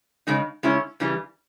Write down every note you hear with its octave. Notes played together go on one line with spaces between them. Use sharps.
C#3 G#3 D#4
C#3 G#3 C#4 E4
C#3 E3 G3